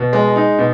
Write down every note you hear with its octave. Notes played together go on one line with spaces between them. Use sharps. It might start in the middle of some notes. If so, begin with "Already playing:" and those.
Already playing: B2
G#3
D#4
B2